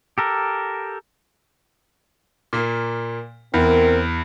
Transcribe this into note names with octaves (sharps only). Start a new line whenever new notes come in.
G4 A4 A#4
A#2 A#3
E2 C4 A#4